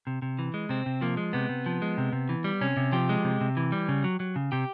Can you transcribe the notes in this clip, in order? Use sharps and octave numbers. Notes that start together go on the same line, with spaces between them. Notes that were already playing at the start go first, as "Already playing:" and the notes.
C3
C3
E3
G#3
C3 C4
C3
F3 A#3
G#3
C3 B3
C3
F3
G#3
C3
C3
E3
G3
C3 C#4
C3
F3 G4
G#3
C3
C3
E3
G3
C#3
F#3
F#3
C#3
C3 G4